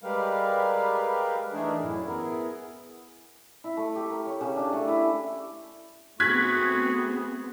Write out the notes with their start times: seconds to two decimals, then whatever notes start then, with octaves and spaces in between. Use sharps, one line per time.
0.03 G3 G#3 G4 A#4 B4 F5
1.53 E3 A3 D4 D#4 G#4 A#4
1.80 F#2 A2 E4
2.06 B3 E4 G#4 A#4
3.64 E4
3.77 A3
3.96 G4
4.10 A#4
4.26 C#5
4.41 C#3
4.57 D4
4.72 A3
4.88 E4
6.20 A3 B3 C4 F#4 G#4 F#6 G#6 B6